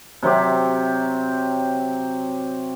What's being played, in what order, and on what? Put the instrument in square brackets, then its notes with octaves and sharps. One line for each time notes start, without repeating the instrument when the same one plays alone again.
[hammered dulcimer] C3 F#3 C4 G4